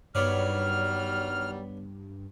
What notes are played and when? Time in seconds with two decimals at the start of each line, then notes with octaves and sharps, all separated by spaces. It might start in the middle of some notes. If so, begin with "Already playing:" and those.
0.15 G2 D#3 F#3 G3 B3 C#5 D5 F6